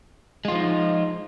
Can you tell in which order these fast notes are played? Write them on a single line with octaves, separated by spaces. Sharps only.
G#3 F4 F3 D#4